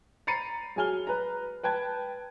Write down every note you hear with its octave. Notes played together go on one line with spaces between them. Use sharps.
A#5 B5 A6 C7 C#7 D#7
F#3 G#4 G#5 F6 G7
B4 A#5
B4 G5 A5 G#6